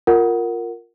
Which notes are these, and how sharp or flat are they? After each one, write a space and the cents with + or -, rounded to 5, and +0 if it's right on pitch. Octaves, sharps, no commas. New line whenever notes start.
F4 +0 A#4 -10 F#5 +0